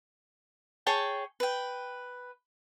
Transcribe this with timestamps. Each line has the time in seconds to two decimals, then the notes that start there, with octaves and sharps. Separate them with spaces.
0.86 G#4 C#5 G5 A5
1.40 B4 G5